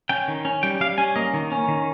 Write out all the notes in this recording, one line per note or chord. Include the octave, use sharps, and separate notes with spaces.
C#4 G5
D#3
C#4
G3 G5
G3 F5
C#4 G#5
A#3 D#5
D#3
C#4
D#3